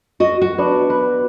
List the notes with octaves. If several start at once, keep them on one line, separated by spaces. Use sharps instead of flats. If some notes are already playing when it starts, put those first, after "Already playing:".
F#4 D#5
F#4
B3 D4
B4